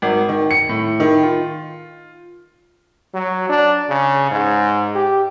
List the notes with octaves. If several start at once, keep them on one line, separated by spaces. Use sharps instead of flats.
G#1
D#3
C#7
A2
D#3
F4
F#3
D4
C#3
G#2
G4